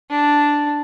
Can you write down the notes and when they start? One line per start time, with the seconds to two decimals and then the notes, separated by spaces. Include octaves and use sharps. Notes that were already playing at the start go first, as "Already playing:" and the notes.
0.11 D4